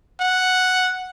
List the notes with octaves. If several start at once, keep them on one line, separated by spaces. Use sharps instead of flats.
F#5